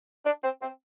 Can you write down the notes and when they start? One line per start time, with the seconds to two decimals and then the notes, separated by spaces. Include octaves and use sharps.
0.25 D4
0.43 C4
0.62 C4